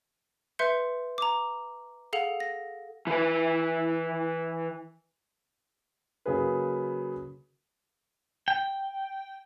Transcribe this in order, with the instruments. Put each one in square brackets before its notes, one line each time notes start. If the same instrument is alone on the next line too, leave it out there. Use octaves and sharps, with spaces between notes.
[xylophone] B4 E5 C6 G6 C#7
A#5 D6
G#4 A4 F5 F#5 F7
A#6
[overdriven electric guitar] E3 B4
[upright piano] C#3 F#3 A#3 G#4 B4
[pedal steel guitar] G5